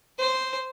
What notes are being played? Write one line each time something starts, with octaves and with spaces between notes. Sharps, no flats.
C5